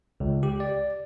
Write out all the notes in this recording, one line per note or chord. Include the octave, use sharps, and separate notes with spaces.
C#2
G4
D5